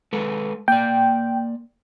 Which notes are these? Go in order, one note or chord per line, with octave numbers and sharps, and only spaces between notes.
G#3 A4 B4
A#3 D5 G5